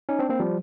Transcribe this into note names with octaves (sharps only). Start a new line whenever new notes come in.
C#4 D#4
C4 D4
A#3 C4
F3 G3